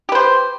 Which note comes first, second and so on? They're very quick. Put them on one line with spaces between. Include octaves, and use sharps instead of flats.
G4 B4 C5